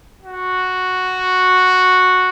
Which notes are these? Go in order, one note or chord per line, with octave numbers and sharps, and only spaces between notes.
F#4